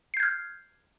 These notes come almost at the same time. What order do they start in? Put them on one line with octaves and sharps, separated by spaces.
C7 G6 G#6 F6